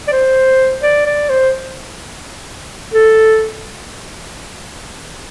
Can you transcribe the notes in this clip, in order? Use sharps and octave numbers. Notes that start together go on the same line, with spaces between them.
D5
C5
D5
D5
C5
A4